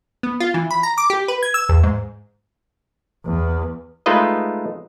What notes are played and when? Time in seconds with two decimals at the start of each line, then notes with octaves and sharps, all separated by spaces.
0.23 B3
0.40 F4
0.54 E3
0.71 B5
0.83 A#5
0.98 D6
1.10 G4
1.28 B4
1.43 G#6
1.54 E6
1.69 E2
1.83 G#2
3.26 E2
4.06 G#3 A3 D#4 F4 B4 D#5